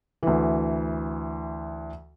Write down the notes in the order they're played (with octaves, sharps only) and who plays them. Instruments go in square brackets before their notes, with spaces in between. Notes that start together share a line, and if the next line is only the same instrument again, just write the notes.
[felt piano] D2 E3